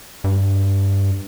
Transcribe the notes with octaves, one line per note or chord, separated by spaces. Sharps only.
G2